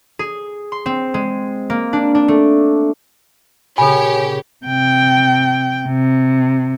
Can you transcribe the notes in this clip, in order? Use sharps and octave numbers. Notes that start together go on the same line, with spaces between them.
G#4
C6
C4
G#3
A#3
D4
D4
A3
A#2 C#3 G4 A4 C#5 G#5 B5
C3 G5
C3